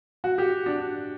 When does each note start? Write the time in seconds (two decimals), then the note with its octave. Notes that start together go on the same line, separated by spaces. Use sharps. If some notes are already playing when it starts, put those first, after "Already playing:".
0.24 F#4
0.38 G4
0.66 D4